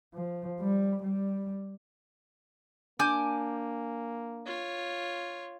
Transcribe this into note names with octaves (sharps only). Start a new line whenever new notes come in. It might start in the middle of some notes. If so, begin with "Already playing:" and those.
F3
G3
G3
A#3 D4 G#5 D6 G6
F4 C#5